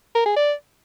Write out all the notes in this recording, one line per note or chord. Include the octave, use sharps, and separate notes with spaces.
A#4
G#4
D5